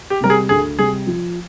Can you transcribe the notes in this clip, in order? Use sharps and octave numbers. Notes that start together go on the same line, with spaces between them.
G4
C3 G3 A#4
G#4
D2 G#4
C3 G3 G#4
F3